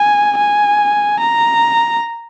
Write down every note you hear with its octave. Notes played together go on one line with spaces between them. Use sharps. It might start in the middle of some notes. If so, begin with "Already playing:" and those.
Already playing: G#5
G#5
A#5